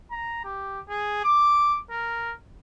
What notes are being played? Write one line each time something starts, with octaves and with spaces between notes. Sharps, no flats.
A#5
G4
G#4
D6
A#4